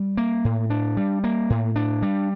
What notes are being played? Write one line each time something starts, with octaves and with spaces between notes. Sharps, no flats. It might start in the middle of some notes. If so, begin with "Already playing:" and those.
Already playing: G3
A#3
A2
D4
G3
A#3
A2
D4
G3